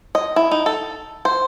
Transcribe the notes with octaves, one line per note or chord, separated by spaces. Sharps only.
D#5
E4
D#4
A4
C5